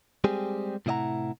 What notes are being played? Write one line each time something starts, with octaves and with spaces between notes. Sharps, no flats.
G3 G#3 C4 G4 G#4
A2 C3 E4 D#5 F#5 A#5